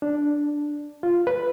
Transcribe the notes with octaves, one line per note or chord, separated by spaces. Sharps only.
D4
F4
B4